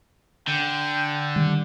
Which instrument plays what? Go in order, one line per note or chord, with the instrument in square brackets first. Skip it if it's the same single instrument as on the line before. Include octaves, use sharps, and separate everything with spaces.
[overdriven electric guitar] D3 [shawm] G5
[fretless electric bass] D#3 G3